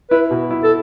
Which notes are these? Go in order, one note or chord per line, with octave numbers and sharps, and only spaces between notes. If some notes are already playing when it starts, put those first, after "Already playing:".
E4 B4
B2
E4
A4